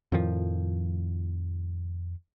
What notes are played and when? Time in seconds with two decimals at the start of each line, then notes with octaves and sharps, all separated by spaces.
0.12 F2 A2 D#3 F3